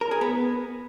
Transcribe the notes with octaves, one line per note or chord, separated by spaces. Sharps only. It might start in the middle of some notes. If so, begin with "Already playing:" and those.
A#4
G#4
B3